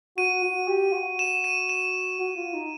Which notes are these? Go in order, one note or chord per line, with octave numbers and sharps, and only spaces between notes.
F#4 D#7
F#4
G4
F#4
E7
D#7
E7
F#4
F4
D#4